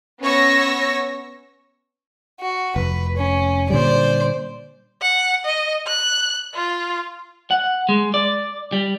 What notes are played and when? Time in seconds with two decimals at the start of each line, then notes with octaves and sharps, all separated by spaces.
0.22 B3 C#4 C#5 C#6 E6 A#6
2.40 F#4
2.76 F1 B4
3.17 C#4
3.70 A#2 D3 G3 C5 D5
5.01 F#5
5.45 D#5
5.87 F#6
6.54 F4
7.51 F#5
7.89 G#3
8.14 D5
8.72 G3